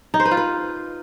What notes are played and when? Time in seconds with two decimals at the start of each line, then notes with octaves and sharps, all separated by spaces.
0.14 D#4
0.20 C5
0.25 B4
0.31 F4
0.37 B4